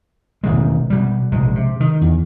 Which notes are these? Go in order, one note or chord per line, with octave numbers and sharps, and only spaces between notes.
E1 A1 D#3 G#3
B2 G3
A#1 C3 G#3
C3
D#3
E2